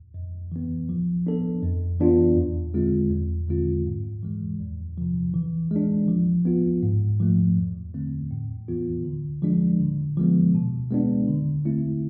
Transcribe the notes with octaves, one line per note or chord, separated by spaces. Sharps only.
F2
E3 B3
F3
B3 D4 A4
F2
E3 B3 D4 F4
E2
D3 G#3 C4 F4
E2
D3 G#3 C4 F4
G#2
E3 G#3
E2
C3 F3
E3
G#3 D4
F3
B3 F4
G#2
F3 A3
E2
D3 A3 C4
A2
E3 B3 F4
D3
F3 G#3 D4
D3
F3 G#3 B3
B2
G#3 B3 D4
D3
A3 C4 E4